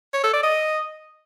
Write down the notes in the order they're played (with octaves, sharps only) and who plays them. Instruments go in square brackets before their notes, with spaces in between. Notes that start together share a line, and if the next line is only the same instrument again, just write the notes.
[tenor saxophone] C#5
A4
D5
D#5